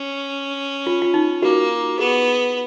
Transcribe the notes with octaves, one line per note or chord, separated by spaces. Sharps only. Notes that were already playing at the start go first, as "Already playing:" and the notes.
Already playing: C#4
F4
F4
D#4
A#3 F#4
B3 G#4